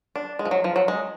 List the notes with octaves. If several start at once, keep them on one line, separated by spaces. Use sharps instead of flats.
D4
G#3
F3
F#3
F3
F#3
G#3